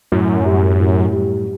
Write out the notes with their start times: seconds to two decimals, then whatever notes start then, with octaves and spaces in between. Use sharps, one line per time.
0.12 F#2 A2
0.45 G3
0.80 A2
1.12 G3